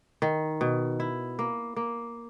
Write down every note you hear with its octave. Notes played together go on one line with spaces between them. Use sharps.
D#3
B2
E4
A#3
A#3